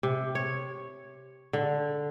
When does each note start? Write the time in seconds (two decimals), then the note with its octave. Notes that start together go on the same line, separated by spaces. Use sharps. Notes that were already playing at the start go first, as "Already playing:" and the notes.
0.03 C3
0.35 C#5
1.53 D3